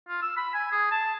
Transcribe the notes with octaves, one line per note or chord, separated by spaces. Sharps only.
F4
E6
B5
G#5
G#4
A5